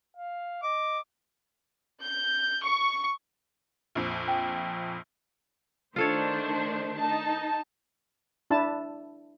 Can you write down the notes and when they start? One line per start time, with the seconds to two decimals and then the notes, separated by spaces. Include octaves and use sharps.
0.17 F5
0.63 D#5 D6
2.01 G6
2.64 C#6
3.95 A#1 F2
4.28 G5
5.96 D#3 A3 D4 F4 A4 C5 C#5
6.99 D#4 A5
8.50 D4 E4 A5